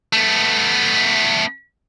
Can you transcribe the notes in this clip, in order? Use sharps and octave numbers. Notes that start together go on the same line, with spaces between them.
A3 B3